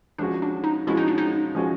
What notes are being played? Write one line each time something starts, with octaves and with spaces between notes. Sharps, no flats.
F3 G#3 C#4 D4 F#4
D4
D#4
F3 G#3 C#4 E4 F#4
D#4
D4
D#4
F3 G#3 C#4 F#4